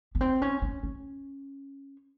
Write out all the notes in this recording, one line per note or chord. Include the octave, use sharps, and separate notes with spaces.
B3
C4
C#4
C#4
C#4